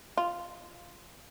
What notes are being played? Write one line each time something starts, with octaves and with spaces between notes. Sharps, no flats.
F4